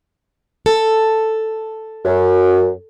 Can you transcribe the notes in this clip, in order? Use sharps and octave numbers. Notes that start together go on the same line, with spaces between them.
A4
F#2